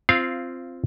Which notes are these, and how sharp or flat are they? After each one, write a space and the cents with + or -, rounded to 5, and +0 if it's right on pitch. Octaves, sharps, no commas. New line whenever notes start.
C4 +0 F4 -10 F5 -20